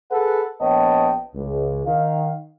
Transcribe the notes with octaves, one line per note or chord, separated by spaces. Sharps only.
G#4 A4 B4 F#5
A#1 B3 C#5 D#5 G5 A5
C#2
D#3 F5